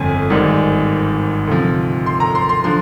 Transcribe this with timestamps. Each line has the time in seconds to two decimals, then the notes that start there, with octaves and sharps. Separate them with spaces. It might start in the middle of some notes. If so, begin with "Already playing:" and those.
Already playing: G1 F2 G#5
0.30 G#1 G#2 G3
1.47 D2 C3 F3
2.06 C6
2.20 A#5
2.35 C6
2.49 C6
2.64 D3 F3 C6